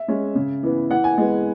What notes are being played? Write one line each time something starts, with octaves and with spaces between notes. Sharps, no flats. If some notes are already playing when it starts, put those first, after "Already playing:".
Already playing: E5
G#3 C#4
C#3
E3 B3
E3 F#5
G#5
G#3 B3